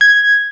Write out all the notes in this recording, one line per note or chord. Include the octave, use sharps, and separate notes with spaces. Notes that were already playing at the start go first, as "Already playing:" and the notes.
G#6